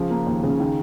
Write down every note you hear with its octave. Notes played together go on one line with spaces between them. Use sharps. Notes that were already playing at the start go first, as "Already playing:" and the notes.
Already playing: C#3 F3
A#3
D#2
C#3
D#3